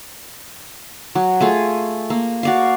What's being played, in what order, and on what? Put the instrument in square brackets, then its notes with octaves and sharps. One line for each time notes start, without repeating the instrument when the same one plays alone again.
[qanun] F#3
A3 F4 G#4
A#3
F#4 D5 F5